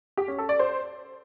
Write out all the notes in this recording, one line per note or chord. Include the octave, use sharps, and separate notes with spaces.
G4
C#4
A4
D5
C5